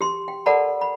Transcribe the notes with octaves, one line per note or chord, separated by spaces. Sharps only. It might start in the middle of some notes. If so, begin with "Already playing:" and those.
G4 C6
G5
A4 A#4 D5 F#5 A5 B5
B5